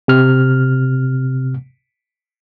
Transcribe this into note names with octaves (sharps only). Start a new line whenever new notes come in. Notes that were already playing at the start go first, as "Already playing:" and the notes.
C3 F6